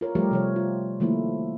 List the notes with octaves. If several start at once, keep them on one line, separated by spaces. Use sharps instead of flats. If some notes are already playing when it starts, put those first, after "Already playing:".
F4 A#4 C#5
F3 G3 A3 G4 A#4
C3 F3 C#5
F4
D#3 F3 A3 A#3 E4